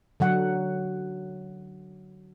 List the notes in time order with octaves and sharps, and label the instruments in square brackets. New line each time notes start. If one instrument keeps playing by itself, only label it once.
[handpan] D3 F#3 F#5